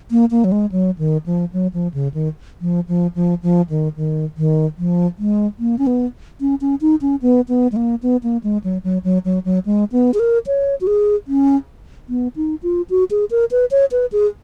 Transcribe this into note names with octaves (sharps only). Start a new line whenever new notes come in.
A#3
A#3
F#3
G#3
F#3
D#3
F3
F#3
F3
C#3
D#3
F3
F3
F3
F3
D#3
D#3
D#3
F3
G#3
A#3
C#4
B3
C#4
C#4
D#4
C#4
B3
B3
G#3
A#3
B3
A#3
G#3
F#3
F#3
F#3
F#3
F#3
G#3
B3
G#4
A#4
C#5
F#4
G#4
C#4
B3
D#4
F4
F#4
G#4
A#4
B4
C#5
B4
G#4